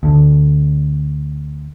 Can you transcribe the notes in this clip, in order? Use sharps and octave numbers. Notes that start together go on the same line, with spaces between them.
D2 D3